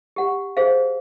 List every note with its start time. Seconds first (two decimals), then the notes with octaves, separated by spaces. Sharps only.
0.16 G4 F#5
0.57 G#4 C5 F5